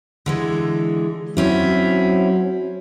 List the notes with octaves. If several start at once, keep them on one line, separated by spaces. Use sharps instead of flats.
D3 E3 G#3
F#3 C4 C#4 E4